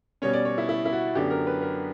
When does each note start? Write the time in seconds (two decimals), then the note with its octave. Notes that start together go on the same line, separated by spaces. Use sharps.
0.22 B2 G3 C#4 C#5
0.33 D5
0.45 C#5
0.58 E4
0.69 E4
0.85 E4
0.93 F#4
1.15 F#2 D3 F#3 B3 D4 G4
1.30 A#4
1.47 B4
1.62 A#4